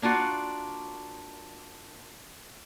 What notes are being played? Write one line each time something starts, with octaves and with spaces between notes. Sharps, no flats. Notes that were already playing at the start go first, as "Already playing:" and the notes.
A#3 D4 F4 F#4